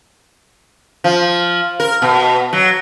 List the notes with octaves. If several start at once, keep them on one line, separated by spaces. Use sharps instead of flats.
F3
A#4
B2
F#3